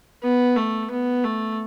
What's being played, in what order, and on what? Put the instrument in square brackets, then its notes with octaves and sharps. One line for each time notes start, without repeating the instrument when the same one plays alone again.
[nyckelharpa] B3
A3
B3
A3